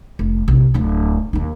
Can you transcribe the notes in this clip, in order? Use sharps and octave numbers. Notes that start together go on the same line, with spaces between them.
F1
A#1 C3
D1 F4
D#2 D#4